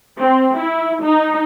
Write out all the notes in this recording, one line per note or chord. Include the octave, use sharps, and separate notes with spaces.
C4
E4
D#4